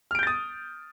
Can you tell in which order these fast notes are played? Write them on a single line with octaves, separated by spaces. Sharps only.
F6 D7 G6 A6 D#6